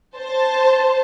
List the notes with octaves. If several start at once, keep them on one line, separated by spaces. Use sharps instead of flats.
C5 A5